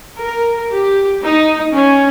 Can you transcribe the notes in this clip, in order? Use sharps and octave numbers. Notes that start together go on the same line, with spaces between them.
A#4
G4
D#4
C#4